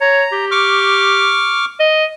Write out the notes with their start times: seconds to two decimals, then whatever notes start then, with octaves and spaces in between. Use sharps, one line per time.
0.01 C#5 A#5
0.32 G4
0.51 C#6 D6 F6
1.80 D#5